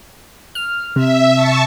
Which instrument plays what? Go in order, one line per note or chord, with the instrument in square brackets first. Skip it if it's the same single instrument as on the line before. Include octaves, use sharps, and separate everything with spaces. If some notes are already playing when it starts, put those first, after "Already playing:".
[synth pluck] F6
[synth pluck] C3 [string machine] E5
[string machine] A5 C#6